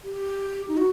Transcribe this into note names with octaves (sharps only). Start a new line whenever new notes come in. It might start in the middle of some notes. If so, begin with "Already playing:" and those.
G4
D#4
F#4